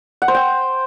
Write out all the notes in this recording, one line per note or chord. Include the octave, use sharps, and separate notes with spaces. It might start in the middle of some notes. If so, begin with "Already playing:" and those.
F#5
C5
G5